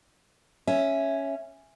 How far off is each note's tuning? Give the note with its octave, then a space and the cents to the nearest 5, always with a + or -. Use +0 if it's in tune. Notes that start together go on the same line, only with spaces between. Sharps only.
C#4 +0 E5 +0